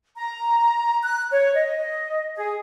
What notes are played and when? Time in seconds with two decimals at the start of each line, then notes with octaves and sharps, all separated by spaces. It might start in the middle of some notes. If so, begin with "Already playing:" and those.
0.16 A#5
1.02 F#6
1.31 C#5
1.55 D#5
2.36 G#4